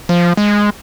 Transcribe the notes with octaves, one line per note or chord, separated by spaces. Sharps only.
F3
G#3